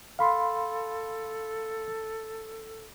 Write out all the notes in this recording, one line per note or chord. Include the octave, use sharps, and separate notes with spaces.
A4 F5 B5 C6